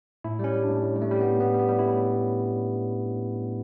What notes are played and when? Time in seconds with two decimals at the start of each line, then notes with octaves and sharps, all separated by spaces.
0.24 A2 E4
0.39 G3 C#4
0.54 G3
0.63 A2 D4
0.82 A2
0.96 G3
1.02 A3
1.11 G3
1.21 A2 B3
1.40 A2 B3
1.54 G3
1.60 B3
1.69 G3
1.79 A2 E4